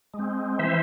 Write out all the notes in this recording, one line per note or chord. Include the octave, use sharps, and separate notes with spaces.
G#3
C4
E3 C5 E5